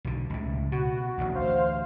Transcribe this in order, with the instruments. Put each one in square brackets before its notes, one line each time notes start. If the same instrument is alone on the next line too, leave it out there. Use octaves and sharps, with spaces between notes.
[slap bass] B1 D3
C#2 A2
[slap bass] B2 [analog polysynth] F#4
[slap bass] A1 D2
[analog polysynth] C5 F5